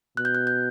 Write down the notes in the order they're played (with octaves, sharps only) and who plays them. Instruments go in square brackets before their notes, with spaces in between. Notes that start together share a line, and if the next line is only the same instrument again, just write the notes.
[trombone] B2 [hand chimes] F#6
[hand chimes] G6
F#6
G6